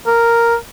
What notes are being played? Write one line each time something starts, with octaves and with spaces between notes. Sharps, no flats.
A#4